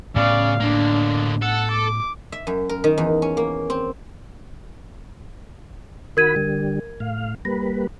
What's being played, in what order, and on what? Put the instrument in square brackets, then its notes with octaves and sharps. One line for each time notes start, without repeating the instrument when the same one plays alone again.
[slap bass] A2 B3 [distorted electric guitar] C#3 [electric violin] D5 F5
[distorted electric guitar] D3 A#3 [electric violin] D4
[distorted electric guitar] A4 [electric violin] F#5
[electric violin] D6
[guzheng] E5
F#2
A#4
D#3
E2
C#4
A#3
C4
[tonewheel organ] D#3 F#4 B5 [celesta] A#4 G#6 D#7
[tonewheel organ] D3 G3
A2 F5
[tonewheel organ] G3 A#3 B4 [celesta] A#6